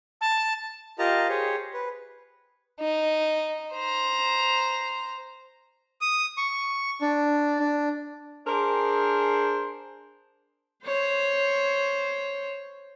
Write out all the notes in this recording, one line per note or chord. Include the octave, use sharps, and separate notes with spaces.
A5
F4 G4 A#4 D#5 A5 A#5
G4 G#4 C5 C#5
B4
D#4
C5 A#5
D#6
C#6
D4
D4
D4 G#4 A#4 C5 C6
C5 C#5